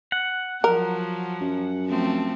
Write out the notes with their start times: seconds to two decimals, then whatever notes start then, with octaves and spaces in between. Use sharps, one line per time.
0.12 F#5
0.64 F3 F#3 A#4
1.41 F#2
1.87 F3 A3 C4